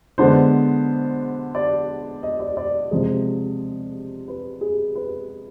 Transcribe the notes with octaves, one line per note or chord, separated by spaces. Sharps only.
D3 G#3 B3 D4 C5
D5
D#5
D5
D5
C3 F3 G#3
B4
G#4
B4